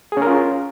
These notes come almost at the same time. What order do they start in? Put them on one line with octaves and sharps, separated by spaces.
G#4 C#4 A#4 F4